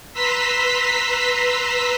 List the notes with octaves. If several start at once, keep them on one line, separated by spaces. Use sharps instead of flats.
B4 A#5 C6 E6 B6